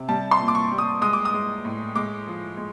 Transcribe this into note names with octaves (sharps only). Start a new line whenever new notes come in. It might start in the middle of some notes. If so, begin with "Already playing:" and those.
Already playing: C3
G3 A5
C6
A#2
D6
C#6
G3
D#6
G#3 D#6
D6
D#6
G#3
A2
G#3 D6
F3
G#3